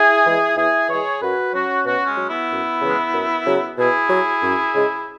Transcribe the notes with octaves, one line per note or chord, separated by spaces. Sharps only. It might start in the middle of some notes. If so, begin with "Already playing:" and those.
Already playing: E4 G#4
E3 G#3
E2 E4 G#4
E3 G#3 G#4 C#5
F#2 F#4 B4
F#3 C#4 F#4
B2 C#4 F#4
G#3 C#4
F#3
B3 E4
F#2
C#3 E3 G#3
F#2
C#3 F#3
B2 E4 G#4
F#3
F#2
C#3 G#3